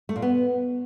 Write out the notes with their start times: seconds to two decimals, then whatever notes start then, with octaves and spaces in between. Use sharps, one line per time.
0.09 A3
0.16 A#2
0.22 B3